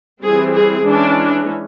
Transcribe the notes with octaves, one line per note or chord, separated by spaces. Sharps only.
E3 G3 C4 G#4
G#4
E3 G#3 C#4 D4